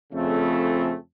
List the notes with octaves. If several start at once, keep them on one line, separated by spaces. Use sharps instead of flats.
F2 C#3 A3 C4